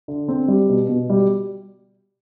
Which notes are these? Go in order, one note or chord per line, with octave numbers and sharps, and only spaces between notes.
D3
C4
G3
B2
B2
G3